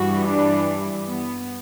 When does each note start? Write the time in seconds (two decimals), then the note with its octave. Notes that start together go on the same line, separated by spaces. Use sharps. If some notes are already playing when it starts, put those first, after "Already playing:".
Already playing: G2 E3 G3 F#4
0.25 D4
1.08 B3